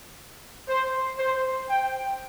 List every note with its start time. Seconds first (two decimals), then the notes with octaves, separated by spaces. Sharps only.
0.68 C5
1.19 C5
1.70 G5